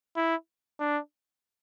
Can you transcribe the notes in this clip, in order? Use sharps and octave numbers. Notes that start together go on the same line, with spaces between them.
E4
D4